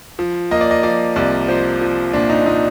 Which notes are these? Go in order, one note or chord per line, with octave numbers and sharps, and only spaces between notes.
F3
A#3 D#5
D5
D#5
F3 D5
C2 D5
F3 C5
F3
A#2 D4
D#4
A#2 D#4